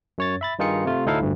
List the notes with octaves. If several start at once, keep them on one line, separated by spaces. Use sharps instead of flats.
F#2 C#5 A6
E5 B5 A6
G2 D#3 D#4 F4 G#4 C#7
C3 A3 F4
D2 A2 D#4 E4 A4 F5
G1 D2 G2